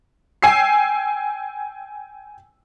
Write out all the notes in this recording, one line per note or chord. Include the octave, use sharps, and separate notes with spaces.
G5 G#5 E6 C7